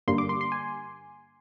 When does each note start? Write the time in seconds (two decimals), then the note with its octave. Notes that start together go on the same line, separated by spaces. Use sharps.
0.08 G2 D3 G3 A#3 C6
0.18 D6
0.29 C6
0.41 C6
0.52 G#5